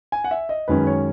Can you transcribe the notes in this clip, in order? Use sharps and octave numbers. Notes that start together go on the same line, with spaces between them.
G#5
F#5
E5
D#5
F#2 D#3 G#3 C#4 B4
C#5